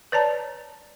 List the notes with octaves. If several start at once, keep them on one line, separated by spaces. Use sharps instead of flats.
B4 C#5 D5 A5 A#5